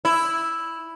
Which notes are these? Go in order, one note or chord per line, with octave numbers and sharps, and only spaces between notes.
E4